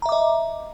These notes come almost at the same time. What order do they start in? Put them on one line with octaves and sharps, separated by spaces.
A#5 E5 D6 D#5